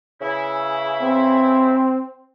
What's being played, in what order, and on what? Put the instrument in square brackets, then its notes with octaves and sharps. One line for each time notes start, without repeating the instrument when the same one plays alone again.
[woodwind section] C#3 E3 E4
[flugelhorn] C4